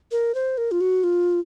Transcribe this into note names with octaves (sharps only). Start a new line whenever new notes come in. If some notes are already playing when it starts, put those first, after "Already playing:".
A#4
C5
A#4
F4
F#4
F4